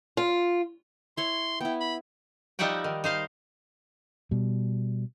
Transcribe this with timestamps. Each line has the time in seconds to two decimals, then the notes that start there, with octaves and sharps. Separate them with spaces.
0.17 F4
1.17 E4 C#5 C6
1.60 B3 E4 G5
1.80 B5
2.59 F3 G3 D#4 E5 F#5 G5
2.84 D#3
3.04 D#4 C5 F5
4.31 B2 G3